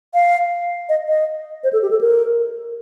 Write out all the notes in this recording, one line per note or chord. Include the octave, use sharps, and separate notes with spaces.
F5
D#5
D#5
C5
A4
G4
A4
A#4